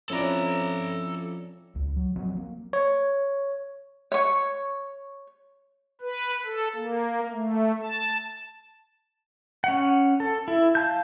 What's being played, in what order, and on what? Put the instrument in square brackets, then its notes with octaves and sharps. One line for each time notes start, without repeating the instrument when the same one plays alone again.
[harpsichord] F2 E4 D5 [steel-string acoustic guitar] C#4 [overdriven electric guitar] A4 A#5
[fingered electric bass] C#2
F#3
F3 F#3 B3 C4
A#3
[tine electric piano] C#5
[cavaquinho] C#5 C#6
[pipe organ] B4
A4
A#3
A3
A5
[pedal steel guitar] C#4 F#5
A4
E4
F5 A5 G6